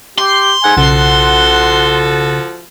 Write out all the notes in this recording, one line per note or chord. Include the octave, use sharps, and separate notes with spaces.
G4 C6
G#2 A3 F#5 G#5
B1 C#3 F3 F#4 A4 F#5